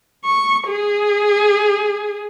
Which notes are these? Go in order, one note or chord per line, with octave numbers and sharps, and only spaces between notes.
C#6
G#4